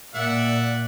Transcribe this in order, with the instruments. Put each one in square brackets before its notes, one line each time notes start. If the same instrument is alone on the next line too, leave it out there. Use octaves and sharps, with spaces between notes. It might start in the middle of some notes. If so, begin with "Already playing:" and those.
[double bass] A#2 [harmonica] D5 E5 F#5